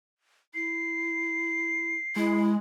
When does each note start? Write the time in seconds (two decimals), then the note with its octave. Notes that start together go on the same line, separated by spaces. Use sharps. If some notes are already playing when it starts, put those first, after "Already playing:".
0.54 E4 C7
2.16 G#3 E4